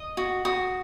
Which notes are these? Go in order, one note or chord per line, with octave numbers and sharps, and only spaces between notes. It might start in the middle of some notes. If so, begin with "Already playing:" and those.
Already playing: D#5 D#6
F#4
F#4 D#6